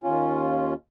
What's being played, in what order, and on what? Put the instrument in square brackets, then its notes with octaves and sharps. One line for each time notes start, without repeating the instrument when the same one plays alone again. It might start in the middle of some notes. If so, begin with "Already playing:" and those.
[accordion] D#2 C#4 F4